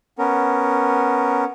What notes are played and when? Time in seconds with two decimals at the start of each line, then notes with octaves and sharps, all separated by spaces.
0.19 B3 C#4 A#4